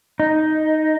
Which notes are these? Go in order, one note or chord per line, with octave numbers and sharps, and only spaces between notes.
D#4